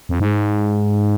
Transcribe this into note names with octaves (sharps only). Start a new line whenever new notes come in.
F2
G#2